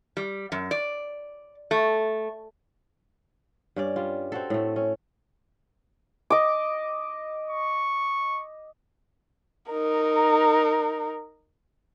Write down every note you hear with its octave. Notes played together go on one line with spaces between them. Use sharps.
G3
F#2
D5
A3
G2 C#4 D5
G3 F4
C4 F#4 A4
A2 A3
C#4
D#5 D6
C#6
D#4 A#4